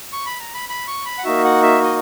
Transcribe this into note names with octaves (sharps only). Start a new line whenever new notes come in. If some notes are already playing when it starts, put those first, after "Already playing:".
C#6
B5
A#5
B5
B5
C#6
B5
F#5
A#3 D#4 F#4 E5
F#5
E5
D#5